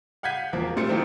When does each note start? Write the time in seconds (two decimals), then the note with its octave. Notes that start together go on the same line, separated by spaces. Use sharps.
0.23 F5 F#5 G6 G#6 B6 D#7
0.53 E1 F3 A#3
0.76 A#2 G3 A3 C5 A6 C#7
0.89 D#3 F3 F#3 A#3 C4 E4